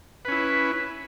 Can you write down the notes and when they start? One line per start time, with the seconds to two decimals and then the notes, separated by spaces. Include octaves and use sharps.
0.25 B4
0.28 C#4
0.32 E4